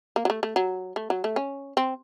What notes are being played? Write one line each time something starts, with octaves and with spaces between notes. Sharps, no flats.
A#3
F#3
A3
A3
F#3
A3
F#3
A3
C#4
C4